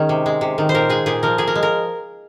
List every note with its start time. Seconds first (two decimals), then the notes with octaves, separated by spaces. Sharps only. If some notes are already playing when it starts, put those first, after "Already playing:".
Already playing: D#3 G#3 C#4
0.09 C3
0.26 G#3
0.41 C3
0.58 D#3
0.69 C5
0.74 A#2 A#4
0.89 G#3 G#4
1.06 A#2 G#4
1.23 F3 A#4
1.38 A#2 G#4
1.47 A#4
1.55 G#3
1.63 A#4